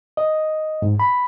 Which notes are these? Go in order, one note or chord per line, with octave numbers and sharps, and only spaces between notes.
D#5
G#2
B5